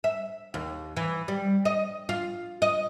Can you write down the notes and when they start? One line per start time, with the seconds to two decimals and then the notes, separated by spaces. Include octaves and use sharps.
0.04 E5
0.54 D#2
0.97 E3
1.28 G3
1.65 D#5
2.09 F4
2.62 D#5